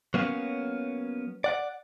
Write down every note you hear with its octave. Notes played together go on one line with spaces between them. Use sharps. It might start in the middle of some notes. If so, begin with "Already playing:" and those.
F#3 A#3 B3 C#4
D5 F#5